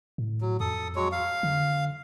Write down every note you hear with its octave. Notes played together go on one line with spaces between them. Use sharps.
A2
F#3
F2 A4 D#6
F#3 G#3 C#5
F5
D3